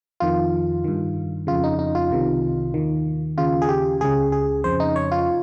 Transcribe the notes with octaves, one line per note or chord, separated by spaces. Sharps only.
F2 D#3 F4
G2 D#3
F2 C#3 F4
D#4
D#4
F4
C2 C3 D#3
D#2 D#3
D#2 C#3 F4
G#4
G4
C#2 C#3 G#4
G#4
F2 C#3 C5
D#4
C#5
F4